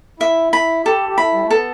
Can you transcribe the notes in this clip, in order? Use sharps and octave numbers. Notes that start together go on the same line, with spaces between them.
E4 E5
E4 B5
G4 A4
G4
E4 B5
G3
A3
B3 A4